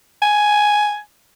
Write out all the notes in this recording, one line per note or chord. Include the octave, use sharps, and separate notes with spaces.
G#5